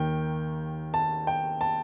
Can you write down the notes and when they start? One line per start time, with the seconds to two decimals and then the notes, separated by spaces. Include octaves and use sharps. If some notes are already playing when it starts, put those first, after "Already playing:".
Already playing: D#2 D#3 G5
0.94 A5
1.27 G5
1.61 A5